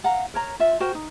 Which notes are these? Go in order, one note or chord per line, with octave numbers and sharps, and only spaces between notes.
F5 F#5 A#5
A#4 C#5 A#5
F4 E5
F#4 A#4 C5 G5
D#4